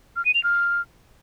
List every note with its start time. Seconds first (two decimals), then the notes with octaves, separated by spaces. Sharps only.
0.16 F6
0.25 D#7
0.34 F7
0.43 F6